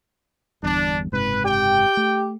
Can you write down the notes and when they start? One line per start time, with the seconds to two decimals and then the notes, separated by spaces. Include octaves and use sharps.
0.63 G1 E2 G2 D4
1.12 F#1 G#2 C3 B4
1.45 G4 G5
1.97 A3